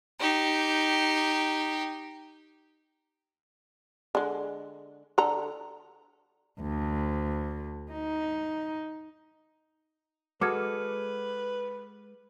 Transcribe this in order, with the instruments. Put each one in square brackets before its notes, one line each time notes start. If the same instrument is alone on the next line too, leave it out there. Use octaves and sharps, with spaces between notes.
[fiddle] D#4 G4
[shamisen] D3 G#3
D3 A4 A#5
[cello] D2
D#4
[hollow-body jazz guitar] G#3 F#4 A4 [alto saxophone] B4 [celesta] D6 F6 G#6